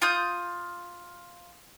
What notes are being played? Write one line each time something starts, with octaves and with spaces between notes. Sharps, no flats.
F4 D#6 G6